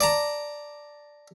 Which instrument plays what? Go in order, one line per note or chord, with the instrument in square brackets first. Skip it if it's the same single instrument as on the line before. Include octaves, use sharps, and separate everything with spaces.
[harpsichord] D5 A5 A#5